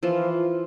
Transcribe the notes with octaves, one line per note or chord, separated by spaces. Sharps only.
E3 F3 F4